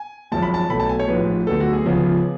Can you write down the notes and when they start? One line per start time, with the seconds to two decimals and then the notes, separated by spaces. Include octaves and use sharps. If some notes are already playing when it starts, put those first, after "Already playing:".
Already playing: G#5
0.32 G#1 F#2 F3 G#3 A5
0.42 B5
0.54 A5
0.70 B1 B2 A3 B5
0.80 A5
0.89 G#5
0.99 C#5
1.08 A1 G#2 F3 G#3 B4
1.47 D2 D3 F#3 B3 A4
1.60 F#4
1.73 G#4
1.86 C#2 C#3 F3 B3